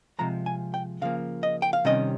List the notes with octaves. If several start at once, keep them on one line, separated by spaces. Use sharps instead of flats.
C3 F3 G#3 A#5
G#5
G5
C#3 F3 A#3 F5
D#5
G5
F5
C3 D#3 G3 C#4 D#5